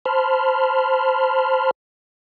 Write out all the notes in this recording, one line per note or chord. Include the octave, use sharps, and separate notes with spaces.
C5 A5 B5 C6 F6